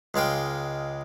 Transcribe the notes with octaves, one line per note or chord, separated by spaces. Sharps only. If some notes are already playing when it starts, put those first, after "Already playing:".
C#2 G#3 F5 G5